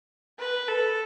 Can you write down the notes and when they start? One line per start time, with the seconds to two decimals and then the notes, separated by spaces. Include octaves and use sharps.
0.39 B4
0.68 A4